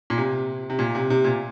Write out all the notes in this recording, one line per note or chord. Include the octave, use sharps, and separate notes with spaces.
A#2
C3
C3
A#2
C3
C3
A#2